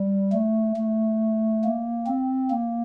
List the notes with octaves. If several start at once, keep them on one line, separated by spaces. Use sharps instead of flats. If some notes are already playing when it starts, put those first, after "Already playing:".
Already playing: G3
A3
A3
A#3
C4
A#3